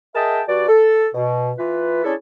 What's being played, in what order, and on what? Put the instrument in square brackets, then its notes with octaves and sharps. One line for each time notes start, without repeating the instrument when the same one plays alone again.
[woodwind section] G#4 A#4 D#5 E5 G5 A5
G2 F#4 D5
A4
B2
E3 F4 B4
C#4 D4 E4 G#4 A4